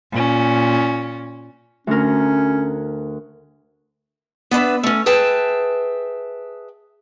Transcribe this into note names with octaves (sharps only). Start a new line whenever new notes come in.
A#2 C#4
D2 C#4 A#4
B3 D4 B4 E5
A3 C#4
G#4 B4 E5 G5 A5